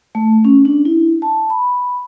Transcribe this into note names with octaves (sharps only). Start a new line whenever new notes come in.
A3
C#4
D4
E4
A5
B5